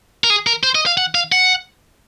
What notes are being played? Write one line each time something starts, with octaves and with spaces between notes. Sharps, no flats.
A#4
G#4
A#4
C5
D#5
F5
F#5
F5
F#5